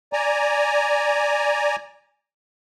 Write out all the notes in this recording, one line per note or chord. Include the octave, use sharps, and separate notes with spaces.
D5 G#5 A#5